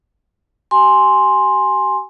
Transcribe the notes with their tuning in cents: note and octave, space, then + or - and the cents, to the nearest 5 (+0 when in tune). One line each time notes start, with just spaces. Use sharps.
G4 -40 G#5 +0 C6 +5